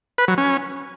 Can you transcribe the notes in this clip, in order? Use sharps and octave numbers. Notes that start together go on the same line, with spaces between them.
B4
F#3
C#4